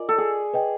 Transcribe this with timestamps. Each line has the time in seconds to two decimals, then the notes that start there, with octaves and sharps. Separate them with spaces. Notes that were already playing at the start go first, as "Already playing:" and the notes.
Already playing: F4 A#4 D5 D#5 G#5
0.09 A4
0.18 G#4
0.54 B4 D#5 G5